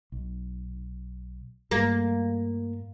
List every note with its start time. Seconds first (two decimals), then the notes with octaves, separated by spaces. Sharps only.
0.12 B1
1.71 G2 G3 A3 A#3